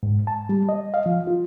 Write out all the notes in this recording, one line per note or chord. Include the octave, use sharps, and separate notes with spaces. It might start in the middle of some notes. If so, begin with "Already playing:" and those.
G#2
A5
G3
D#5
F5
F3
F4